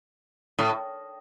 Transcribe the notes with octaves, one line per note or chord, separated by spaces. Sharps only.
A2